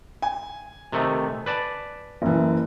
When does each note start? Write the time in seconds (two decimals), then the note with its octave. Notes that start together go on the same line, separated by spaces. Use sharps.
0.22 G#5
0.92 C3 D#3 A3
1.46 B4 D5 A5
2.22 F#1 E3